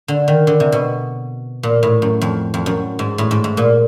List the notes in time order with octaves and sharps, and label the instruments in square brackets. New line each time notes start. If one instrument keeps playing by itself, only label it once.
[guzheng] D3
D#3
D3
C3
B2
A#2
A2
F#2
F2
F2
F#2
G#2
A2
G#2
G#2
A#2